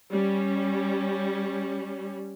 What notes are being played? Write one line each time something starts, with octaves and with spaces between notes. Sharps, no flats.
G3 C#4